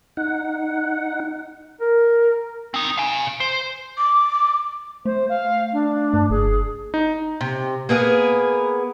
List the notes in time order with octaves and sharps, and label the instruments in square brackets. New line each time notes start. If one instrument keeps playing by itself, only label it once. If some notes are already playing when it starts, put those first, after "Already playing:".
[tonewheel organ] D#4 F#5
[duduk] A#4
[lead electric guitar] C4 D#4
F5 G#5
C5
[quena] D6
[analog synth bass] A3 [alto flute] C5
[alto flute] F5
D4
[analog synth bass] G2
[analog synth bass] F#1 [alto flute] G#4
[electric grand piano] D#4
[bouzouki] C3
A#3 B3 G#4 A#4